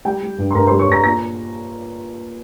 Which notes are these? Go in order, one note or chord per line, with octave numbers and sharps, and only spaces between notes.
G3 G5
G3
G2
C6
G2 A#4 A#5
C5 C6
G3
C#5 C#6
G2 A#5 A#6
A#2 A#5 A#6